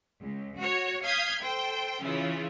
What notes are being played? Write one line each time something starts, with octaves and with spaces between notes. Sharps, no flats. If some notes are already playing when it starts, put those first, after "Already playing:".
C#2
F#4 C#5
F5 D#6 F6 G6 G#6 B6
A4 C5 G5
C#3 E3 C#4 E4 F4